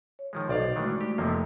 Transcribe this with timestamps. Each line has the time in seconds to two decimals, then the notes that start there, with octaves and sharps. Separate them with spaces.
0.19 C#5
0.33 D#3 F3 G#3
0.49 B1 C5 D5 D#5 F5
0.76 D#3 E3 G#3 A3 D4 F#4
1.01 G4
1.18 F1 C3 F3 A#3